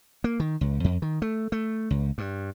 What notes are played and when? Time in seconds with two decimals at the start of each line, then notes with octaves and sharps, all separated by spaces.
0.24 A#3
0.40 D#3
0.61 C#2
0.84 F2
1.02 D#3
1.22 A3
1.52 A3
1.90 C#2
2.18 G2